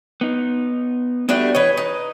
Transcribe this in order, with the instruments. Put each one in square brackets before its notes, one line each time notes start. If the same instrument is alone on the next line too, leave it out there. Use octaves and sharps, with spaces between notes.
[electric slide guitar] B3 D#4
[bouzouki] G3 A3 D4 [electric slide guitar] B3 F#4 G4
[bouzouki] E3 C#5 [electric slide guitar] B4 D#5
[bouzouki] D#4